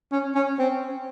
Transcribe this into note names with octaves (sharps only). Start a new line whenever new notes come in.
C#4
C#4
C4